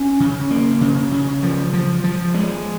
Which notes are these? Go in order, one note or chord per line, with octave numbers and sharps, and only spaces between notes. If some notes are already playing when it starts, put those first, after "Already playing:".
Already playing: C#4
C#3
A#3
C#3
C#3
F3
F3
F3
G#3